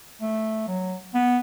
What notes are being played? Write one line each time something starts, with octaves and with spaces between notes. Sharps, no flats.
A3
F#3
B3